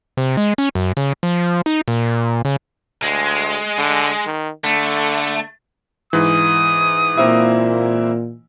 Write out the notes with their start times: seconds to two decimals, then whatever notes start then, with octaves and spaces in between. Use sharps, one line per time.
0.17 C3
0.37 G#3
0.58 C#4
0.75 F#2
0.97 C#3
1.23 F3
1.66 D#4
1.88 A#2
2.45 C#3
3.03 D2 G#3
3.78 D3
4.26 D#3
4.64 D3 A3
6.13 G#2 E3 D#6
7.17 A#2 A#3 C4 E4